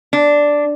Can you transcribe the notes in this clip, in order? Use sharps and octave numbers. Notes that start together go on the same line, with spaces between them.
D4